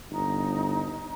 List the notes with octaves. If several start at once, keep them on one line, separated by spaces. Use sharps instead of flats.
G1 D#4